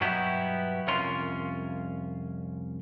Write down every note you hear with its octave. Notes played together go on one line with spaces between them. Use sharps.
G2 B2 F#3 B3 E4 G4
C2 F2 C#4 F4 A#4 C6